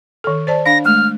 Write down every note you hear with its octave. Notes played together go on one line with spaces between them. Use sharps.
D#3 A4
C5 D5 A5
D4 F5 A#6
G#3 A3 F6